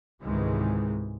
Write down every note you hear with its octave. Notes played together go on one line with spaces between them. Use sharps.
C#2 G#2 C3 D#3 E3 G#3